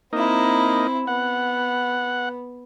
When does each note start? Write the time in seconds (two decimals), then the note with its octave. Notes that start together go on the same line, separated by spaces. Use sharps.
0.13 A#3 C4 D#4 E4
1.07 B3 F#5